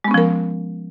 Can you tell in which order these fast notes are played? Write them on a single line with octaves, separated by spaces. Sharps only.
G#3 B3 C#4 F3 A#4